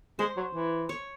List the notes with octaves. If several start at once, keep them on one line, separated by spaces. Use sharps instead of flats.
G#3 C5
F#3
E3
C#5